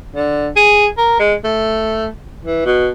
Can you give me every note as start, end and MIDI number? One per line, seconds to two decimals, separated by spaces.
0.15 0.49 50
0.56 0.87 68
0.97 1.19 70
1.19 1.34 56
1.44 2.07 57
2.45 2.62 52
2.65 2.89 47